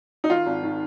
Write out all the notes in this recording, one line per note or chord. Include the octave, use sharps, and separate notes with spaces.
D#4
D#3 F4
G#1
D#3